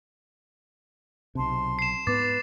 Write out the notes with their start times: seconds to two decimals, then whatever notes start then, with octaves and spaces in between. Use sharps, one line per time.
1.35 B1 C3 A5 C6
1.79 C7 E7
2.07 G#2 B3 B4 D6 A6